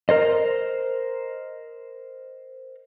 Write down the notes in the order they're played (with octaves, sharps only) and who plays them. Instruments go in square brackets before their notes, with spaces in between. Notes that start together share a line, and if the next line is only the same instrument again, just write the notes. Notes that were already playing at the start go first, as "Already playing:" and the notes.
[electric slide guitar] A#4 C5 D#5